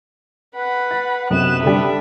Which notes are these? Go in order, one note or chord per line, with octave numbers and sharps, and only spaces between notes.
B4 F#5 B5
A6
B1 F#2 C3 B3 F#6 E7
D3 G3 D4 E5